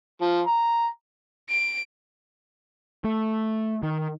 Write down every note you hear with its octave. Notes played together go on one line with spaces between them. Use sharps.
F3
A#5
D7
A3
D#3